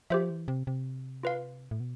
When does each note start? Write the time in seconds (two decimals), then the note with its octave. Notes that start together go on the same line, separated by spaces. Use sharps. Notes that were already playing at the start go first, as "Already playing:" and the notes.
0.10 F3 G4 C5 E5
0.30 E3
0.48 C3
0.67 C3
1.23 F4 B4 F5
1.71 A2
1.80 B2